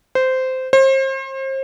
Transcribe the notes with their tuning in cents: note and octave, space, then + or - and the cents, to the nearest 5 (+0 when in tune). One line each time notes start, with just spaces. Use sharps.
C5 -15
C5 +35